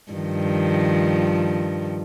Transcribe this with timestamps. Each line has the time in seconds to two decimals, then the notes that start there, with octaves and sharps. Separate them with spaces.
0.12 G2 D#3 F3